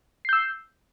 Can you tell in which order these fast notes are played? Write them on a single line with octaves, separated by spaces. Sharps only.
C7 G6 E6